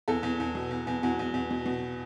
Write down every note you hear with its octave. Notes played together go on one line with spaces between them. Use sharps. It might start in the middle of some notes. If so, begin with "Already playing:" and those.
E2 A4
E2
E2
B2
E2
E2
E2 F#4
E2
E2
B2
B2